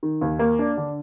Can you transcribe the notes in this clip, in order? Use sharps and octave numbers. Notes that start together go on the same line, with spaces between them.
D#3
D#2
A#3
D4
D3